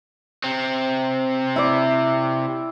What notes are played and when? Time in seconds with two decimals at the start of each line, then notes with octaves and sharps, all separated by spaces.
0.44 C3 C4
1.56 E4 D5